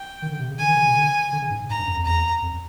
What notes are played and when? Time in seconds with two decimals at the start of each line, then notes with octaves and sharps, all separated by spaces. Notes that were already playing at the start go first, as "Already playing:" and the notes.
Already playing: G5
0.22 D#3
0.31 D3
0.40 C3
0.50 C#3
0.58 D3 G#5
0.67 D#3
0.77 C#3
0.86 C3
0.96 D3
1.32 D3
1.42 C#3
1.50 G#2
1.69 G#2 A#5
1.78 G2
1.87 F#2
1.96 F2
2.05 E2 A#5
2.42 F2